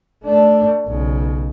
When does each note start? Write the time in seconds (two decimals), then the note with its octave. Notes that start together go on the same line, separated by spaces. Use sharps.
0.24 A3 D4
0.86 B1 C#3